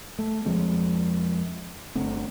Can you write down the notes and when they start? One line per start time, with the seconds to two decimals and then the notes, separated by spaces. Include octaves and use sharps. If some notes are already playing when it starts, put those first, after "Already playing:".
0.19 A3
0.45 F2 F3 G#3 C4
1.95 G1 D3 A3 C4